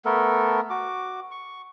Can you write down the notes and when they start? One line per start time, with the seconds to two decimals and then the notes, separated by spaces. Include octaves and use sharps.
0.05 A3 B3 A4 A#4
0.70 F#4 D6
1.31 C#6